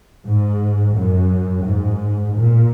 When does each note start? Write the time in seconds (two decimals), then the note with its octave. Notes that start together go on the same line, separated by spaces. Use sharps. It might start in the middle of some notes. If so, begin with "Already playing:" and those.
0.25 G#2
0.94 F#2
1.64 G#2
2.35 A#2